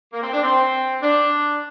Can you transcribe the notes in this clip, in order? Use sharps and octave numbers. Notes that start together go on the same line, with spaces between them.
A#3
C4
D4
C4
D4